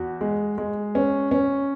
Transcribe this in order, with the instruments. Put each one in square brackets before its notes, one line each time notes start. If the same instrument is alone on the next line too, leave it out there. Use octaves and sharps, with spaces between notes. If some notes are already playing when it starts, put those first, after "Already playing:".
Already playing: [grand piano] E2 F#4
G#3
G#3
C#4
C#4